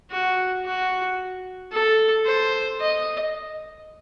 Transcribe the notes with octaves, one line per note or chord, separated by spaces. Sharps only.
F#4
F#4
A4
C5
D#5